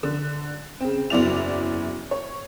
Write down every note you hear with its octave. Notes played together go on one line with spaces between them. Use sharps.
D3
C#3 C4
F#1 E2 F#3 E4 D5 F7
C#5